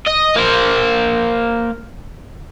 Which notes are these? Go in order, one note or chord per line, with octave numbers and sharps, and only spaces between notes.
D#5
A#3 C5